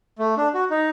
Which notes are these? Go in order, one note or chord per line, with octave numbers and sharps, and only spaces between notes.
A3
D4
F#4
D#4